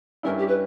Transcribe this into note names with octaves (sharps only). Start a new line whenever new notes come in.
G2 G3 C#4 E4 A#4
G4
B4